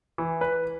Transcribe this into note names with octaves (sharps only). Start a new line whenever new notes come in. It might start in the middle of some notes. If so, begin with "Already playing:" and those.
E3
B4